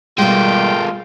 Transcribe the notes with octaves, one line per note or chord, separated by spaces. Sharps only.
B2 G3 G#3 A#3 F4 G5